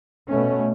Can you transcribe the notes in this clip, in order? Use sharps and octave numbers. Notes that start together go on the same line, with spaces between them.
B2 A3 C#4